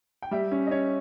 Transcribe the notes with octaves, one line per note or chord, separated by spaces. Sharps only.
G5
G3 E5
C#4
D#5
C#4 C#5